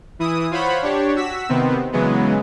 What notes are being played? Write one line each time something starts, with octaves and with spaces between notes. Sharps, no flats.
E3 E4 D#6
F4 C5 C#5 F#5 B5
D4 G4 C#5
F#4 E6 B6
C3 D#3 B3 C4
C#3 E3 F#3 G#3 B3